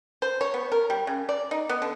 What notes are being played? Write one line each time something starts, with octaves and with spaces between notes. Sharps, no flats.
C5
C#5
B3
A#4
G3
C#3
D5
D#4
B3
D3